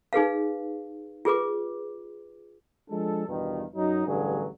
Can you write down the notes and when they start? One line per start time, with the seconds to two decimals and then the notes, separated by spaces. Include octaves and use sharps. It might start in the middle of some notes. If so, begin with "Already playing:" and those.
0.13 D#4 G#4 B4 F5
1.25 F4 G#4 B4 D6
2.91 F3 G#3 D4 A4
3.28 E2 G2 B2 D#3
3.76 F#2 F#3 D#4
4.06 A1 G2 D3 F#3 G#4